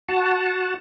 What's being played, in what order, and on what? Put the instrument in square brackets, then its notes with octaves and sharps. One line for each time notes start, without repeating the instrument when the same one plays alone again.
[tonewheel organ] F#4 F#5 A5